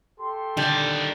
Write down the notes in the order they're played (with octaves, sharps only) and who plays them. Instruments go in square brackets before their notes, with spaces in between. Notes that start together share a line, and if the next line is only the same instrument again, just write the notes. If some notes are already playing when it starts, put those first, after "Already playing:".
[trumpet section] G4 A4 C6
[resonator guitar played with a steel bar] D3 G3 [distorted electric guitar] D#3 D5